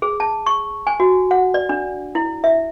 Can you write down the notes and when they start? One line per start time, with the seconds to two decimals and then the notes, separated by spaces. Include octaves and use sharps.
0.02 G#4
0.20 A5
0.46 C#6
0.87 G#5
1.00 F#4
1.31 F#5
1.54 D5
1.69 D4
2.15 E4
2.44 E5